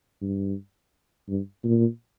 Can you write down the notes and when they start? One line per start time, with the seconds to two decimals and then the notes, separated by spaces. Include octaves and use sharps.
0.21 G2
1.28 G2
1.64 A#2